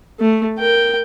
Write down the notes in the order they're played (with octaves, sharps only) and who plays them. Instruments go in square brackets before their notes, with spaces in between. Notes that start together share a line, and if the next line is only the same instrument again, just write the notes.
[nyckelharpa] A3
A#4 G5